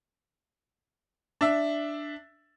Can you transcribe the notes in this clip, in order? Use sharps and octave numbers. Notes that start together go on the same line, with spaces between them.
D4 E5